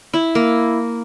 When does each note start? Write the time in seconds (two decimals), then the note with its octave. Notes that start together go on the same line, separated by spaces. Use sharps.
0.14 E4
0.35 A#3